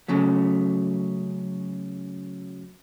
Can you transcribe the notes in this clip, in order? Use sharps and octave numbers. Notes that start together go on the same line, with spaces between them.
C#3 F#3 A3